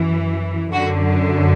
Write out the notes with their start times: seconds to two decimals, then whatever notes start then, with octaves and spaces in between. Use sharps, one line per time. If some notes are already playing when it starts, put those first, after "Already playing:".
Already playing: F#2 E3
0.72 F#2 D3 F#4